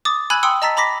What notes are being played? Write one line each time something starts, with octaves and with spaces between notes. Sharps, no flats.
D6 D#6 A6
G#5 B5 E6 F#6 G#6 F#7
G5 C6 D#6 E6 C#7
D#5 A5 A#5 E6 A6 B6
A#5 B5 D6 A#6 B6